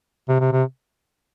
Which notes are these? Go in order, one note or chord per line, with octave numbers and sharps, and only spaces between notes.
C3
C3
C3